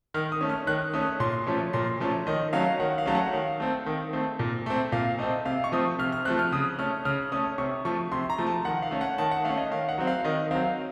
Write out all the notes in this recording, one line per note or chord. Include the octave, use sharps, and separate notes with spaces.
D#3 F6
D#6
A3 C#4
F6
D#3 F#6
A3 C#4 D#6
A#2 C6
F3 A3 C#4
A#2 C6
F3 A3 C#4
D#3 D#5
F#3 A3 C#4 F5
D#3 F#5
F5
F#3 A3 C#4
F#5
D#3 F5
A3 C4
D#3
A3 C4
A#2
A3 C4
A#2 F5
A3 C4 D#5
C3 F5
C#6
F3 A3 C4 D#6
C3 F6
F6
F3 A3 C4 F#6
F6
C#3 D#6
A3 C#4 F6
C#3 F6
A3 C#4 D#6
C3 C#6
F3 A3 C#6
C3 C6
A#5
F3 A3
A5
D#3 F#5
F5
A3 C#4
F#5
D#3 A5
F#5
A3 C#4 F5
D#5
D#3 F5
F#5
F#3 C4
F5
D#3 D#5
F#3 C4 F5